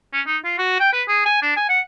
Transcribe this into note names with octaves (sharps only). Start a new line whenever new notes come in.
C#4
D#4
F4
F#4
G5
B4
G#4
G#5
D4
G#5
F#5